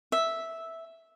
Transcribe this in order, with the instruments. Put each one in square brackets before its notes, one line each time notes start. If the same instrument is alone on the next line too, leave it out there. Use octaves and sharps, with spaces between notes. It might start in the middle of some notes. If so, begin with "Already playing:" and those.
[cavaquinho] E5